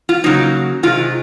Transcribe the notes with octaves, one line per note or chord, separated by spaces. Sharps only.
F4
C#3 F#3 A#3 D#4
C3 D#3 G#3 F4